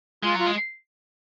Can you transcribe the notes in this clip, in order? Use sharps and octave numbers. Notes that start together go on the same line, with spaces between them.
G#3 F4
F#3
F4
G#3